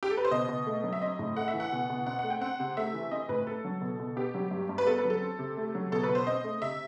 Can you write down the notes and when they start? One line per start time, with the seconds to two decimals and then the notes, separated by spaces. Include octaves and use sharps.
0.03 G4
0.11 A4
0.17 B4
0.25 C5
0.31 B2 D#5
0.49 B2
0.66 A3
0.84 F#3
0.93 E5
1.01 C4 D#5
1.19 A2
1.36 A3 F#5
1.48 E5
1.54 E3
1.60 F#5
1.72 B2
1.90 B2
2.06 C4 F#5
2.19 A3 F#5
2.30 G5
2.41 C4 F#5
2.60 C3
2.77 A3 E5
2.94 E3
3.11 C4 D#5
3.29 A2 B4
3.47 A3 A4
3.65 F#3
3.81 B2
3.99 B2
4.16 B3 G4
4.34 F#3
4.51 G2
4.69 G2
4.78 B4
4.87 B3 A4
4.98 B4
5.05 F#3
5.10 A4
5.21 C4
5.39 C3
5.57 A3
5.75 F#3
5.92 B2 A4
6.03 B4
6.09 B2
6.15 C5
6.27 C4 D#5
6.44 A3
6.61 C3 E5